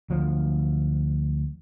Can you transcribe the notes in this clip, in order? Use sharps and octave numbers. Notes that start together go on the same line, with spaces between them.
D2 F3 F#3